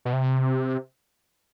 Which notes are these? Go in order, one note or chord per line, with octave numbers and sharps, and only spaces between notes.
B2
C3